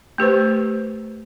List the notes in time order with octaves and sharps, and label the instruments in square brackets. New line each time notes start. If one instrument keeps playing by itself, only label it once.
[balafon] A3 G4 B4 C5